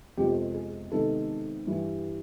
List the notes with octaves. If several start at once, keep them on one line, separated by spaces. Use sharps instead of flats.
F2 C3 F3 G#3 B3 G4
G#4
C3 D#3 G#3 B3 A4
G2 E3 G3